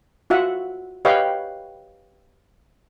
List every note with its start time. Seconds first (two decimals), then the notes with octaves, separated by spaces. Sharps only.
0.30 F4 F#4 E5 F#5
1.05 G4 B4 C#5 D#5 F5 G5